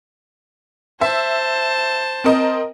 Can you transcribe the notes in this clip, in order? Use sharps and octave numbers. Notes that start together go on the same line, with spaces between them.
C5 E5 A5
C4 A#4 D#5